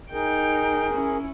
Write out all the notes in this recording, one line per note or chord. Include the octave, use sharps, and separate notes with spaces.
D#4 G#4 A#4 G5
C#4 E4